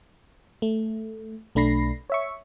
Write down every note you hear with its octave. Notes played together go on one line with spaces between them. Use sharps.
A3
B1 A3 D4 B5 A#6 C7
C#5 E5 C#6